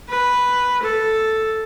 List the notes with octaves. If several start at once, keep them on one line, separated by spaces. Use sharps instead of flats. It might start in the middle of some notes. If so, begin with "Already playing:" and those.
B4
A4